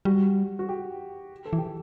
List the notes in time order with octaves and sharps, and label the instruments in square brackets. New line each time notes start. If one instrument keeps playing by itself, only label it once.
[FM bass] G3 [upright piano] F#4
[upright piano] F#4
G4
A4
[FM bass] E3
[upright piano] G4